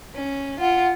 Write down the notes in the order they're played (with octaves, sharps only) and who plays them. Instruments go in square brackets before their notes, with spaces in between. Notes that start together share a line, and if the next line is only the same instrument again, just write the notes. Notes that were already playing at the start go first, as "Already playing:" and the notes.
[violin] C#4
[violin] F4 [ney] F#5